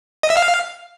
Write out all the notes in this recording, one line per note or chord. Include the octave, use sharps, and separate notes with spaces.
D#5
E5
F5